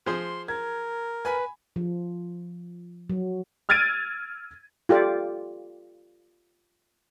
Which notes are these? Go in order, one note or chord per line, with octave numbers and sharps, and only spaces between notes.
F3 G#4 C5 C6
A#4 G#6
B4 G#5 B5
F3
F#3
E6 F6 G#6 A6 D7 D#7
F4 G4 A4 D5